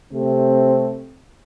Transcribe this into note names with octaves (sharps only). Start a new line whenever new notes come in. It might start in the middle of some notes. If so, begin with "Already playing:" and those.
C3 A3 C4